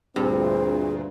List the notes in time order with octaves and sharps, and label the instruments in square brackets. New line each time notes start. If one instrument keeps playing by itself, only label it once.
[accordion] D2 A#2 [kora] G2 [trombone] C4 [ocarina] G#4